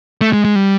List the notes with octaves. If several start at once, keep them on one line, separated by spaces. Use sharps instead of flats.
A3
G#3
G#3
G3